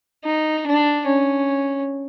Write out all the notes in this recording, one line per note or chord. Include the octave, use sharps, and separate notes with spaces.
D#4
D4
C#4